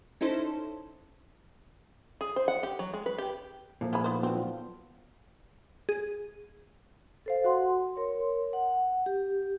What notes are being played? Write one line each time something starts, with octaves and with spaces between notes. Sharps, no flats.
C#4 D#4 E4 A4 C5
G#4
C5
F#5
G4
F#3
G#3
B4
G4
A#2 F3 A3
E4 G#4 B5
B3 D#4 C5
B3 C4 D4 F#4
F#3 F4 C5
G#4
A4 C5 F5
F#4 F#5 C6
A#4 C#5 C6
F#5
G4